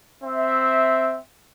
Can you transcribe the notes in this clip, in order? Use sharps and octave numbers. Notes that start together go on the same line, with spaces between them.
C4 E5